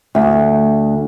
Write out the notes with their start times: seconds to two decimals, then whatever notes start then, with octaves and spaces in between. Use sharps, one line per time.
0.15 D2